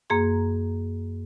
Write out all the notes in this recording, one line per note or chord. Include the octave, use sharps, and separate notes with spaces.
F#2 A#3 G#4 C6